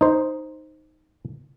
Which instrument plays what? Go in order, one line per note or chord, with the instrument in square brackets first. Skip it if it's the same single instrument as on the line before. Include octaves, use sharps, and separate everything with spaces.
[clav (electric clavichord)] D#4 C5